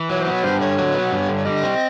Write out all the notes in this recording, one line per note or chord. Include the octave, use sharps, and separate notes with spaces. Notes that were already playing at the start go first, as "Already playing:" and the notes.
Already playing: E3
F#3 C#5
C5
B3
C#5
G2 C5
D3 C#5
F#3
B3
G2
D3
G3 D#5
C4